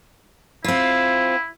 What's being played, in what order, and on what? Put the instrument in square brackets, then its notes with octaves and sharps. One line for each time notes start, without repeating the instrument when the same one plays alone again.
[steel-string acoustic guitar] C4 F4 [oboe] E4